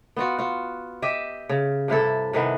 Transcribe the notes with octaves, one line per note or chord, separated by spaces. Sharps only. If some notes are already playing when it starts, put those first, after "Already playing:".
B3 F4 F#4
F4 F#4
G4 D#5 E5
C#3
G2 C3 E4 A4
C3 D#3 E3 B3